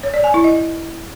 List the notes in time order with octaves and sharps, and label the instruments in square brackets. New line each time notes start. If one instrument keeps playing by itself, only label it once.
[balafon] C#5
D5
G#5
E4
D#5